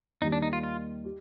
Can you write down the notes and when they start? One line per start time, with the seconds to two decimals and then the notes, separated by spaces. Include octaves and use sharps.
0.22 D#2 D#3 G3 D#4
0.32 D4
0.42 D#4
0.53 F4
0.63 F4
1.04 G4